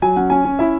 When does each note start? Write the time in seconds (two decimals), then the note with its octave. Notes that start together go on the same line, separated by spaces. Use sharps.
0.02 F#3 G#5
0.16 C#4 F#5
0.30 C#4 G#5
0.45 C#4
0.59 E4 E5